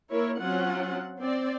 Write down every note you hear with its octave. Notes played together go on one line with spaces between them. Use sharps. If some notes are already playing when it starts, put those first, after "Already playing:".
A#3 E4 A#4 C#5
F#3 C4 C#4 F4 F#5
C4 D5